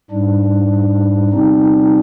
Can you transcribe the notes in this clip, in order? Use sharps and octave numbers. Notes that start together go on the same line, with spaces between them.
G#2 G3 D4
C3 G3 C4 D#4